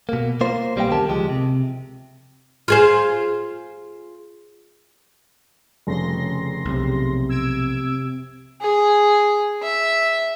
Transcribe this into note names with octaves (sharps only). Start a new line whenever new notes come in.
B2 A#3
A#3 F4 C5
B1 G3 A#3 B3 F5 G5
E2 D3 C#4 G4 A#4 A5
C#2 F3 G#3 G4
C3
F4 G#4 C5
F1 C#3 C6 A#6
B1 C3
E6 G#6 D7
G#4
E5